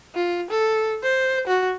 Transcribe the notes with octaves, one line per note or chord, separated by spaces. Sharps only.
F4
A4
C5
F#4